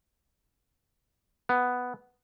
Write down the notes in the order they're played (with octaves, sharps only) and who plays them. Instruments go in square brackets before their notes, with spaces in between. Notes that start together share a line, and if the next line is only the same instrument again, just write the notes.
[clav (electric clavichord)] B3